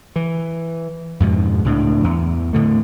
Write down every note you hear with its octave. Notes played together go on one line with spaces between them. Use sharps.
E3
F2 G#2 B2
C#2 A2 C4 D4
E2
A2 D3 A3